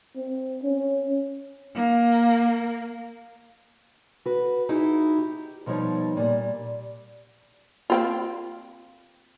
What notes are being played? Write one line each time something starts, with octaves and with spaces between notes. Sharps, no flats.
C4
C#4
A#3
F#4 B4
D#4 E4 F#4 G#4
G4
B2 F3 G3 D#4 C#5
A#2 G3
A#3 C4 F4